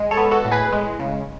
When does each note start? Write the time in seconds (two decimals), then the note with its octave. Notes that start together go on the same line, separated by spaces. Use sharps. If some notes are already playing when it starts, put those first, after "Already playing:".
Already playing: G#3
0.11 A4 C#5
0.17 B3
0.31 F#4 A4
0.45 A2
0.51 G#4 B4
0.72 G#3
1.00 C#3